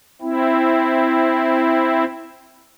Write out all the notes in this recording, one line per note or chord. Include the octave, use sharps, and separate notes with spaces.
C4 E4